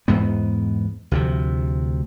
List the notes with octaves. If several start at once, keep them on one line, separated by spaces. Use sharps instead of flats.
E2 G#2 B3
D2 C3 F3